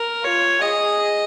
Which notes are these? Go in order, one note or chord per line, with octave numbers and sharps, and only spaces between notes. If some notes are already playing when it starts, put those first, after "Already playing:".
Already playing: A#4
F4 C#5
G#4 D#5